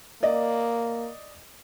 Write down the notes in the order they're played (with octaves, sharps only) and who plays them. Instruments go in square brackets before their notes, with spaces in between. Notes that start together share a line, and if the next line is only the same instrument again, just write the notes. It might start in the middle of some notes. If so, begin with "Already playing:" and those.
[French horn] A#3 [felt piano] D5 D#5